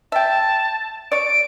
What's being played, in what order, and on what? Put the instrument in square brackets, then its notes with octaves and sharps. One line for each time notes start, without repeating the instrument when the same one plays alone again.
[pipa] E5 G5 [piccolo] A5
[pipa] C#5 D5 [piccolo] D7